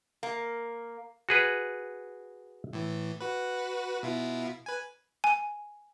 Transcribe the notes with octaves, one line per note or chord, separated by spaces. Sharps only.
A#3
F#4 G#4 B4
A2 E3
F#4 B4
B2 E4 F4
B4 G#5
G#5